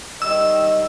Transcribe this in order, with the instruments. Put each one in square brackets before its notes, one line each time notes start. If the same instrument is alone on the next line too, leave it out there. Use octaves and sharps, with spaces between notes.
[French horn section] D#3 G3 D#5 [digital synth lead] E6